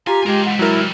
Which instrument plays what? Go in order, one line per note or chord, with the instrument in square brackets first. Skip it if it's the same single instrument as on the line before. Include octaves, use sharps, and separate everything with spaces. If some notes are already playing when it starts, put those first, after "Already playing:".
[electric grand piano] F4 [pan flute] G4 [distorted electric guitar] G#5 [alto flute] A#5
[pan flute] G#3 [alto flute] G4 [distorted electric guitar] G#4 A#4
[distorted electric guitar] E3 G3 [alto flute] F#5
[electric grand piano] F#3 A#4 [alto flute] E4